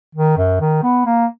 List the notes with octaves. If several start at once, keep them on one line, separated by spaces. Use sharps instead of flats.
D#3
F#2
D#3
B3
A#3